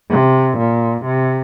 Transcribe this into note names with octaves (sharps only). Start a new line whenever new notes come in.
C3
A#2
C3